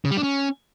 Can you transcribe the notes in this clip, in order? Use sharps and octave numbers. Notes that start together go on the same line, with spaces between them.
C#3
G3
D4
C#4